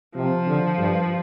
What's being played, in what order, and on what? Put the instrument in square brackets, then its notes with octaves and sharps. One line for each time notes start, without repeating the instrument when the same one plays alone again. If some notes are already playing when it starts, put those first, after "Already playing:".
[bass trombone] C3 [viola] F3
[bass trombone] D3
G2